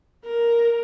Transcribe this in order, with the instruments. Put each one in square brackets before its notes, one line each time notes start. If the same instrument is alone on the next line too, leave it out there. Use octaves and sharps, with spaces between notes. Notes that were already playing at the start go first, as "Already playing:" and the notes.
[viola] A#4